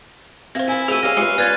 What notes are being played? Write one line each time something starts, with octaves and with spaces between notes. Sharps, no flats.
C4 C5 E5 F5 G5 A#6
E4 F4 G#5
F3 A3 F#4 G#4 E6 D#7
G3 C#4 F5 A#6
G#3 C#4 F4 G4 B4
C#4 F4 B4 D5 F#6 G#6 A6